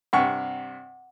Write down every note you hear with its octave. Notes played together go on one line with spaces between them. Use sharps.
G2 C3 F#5 C#6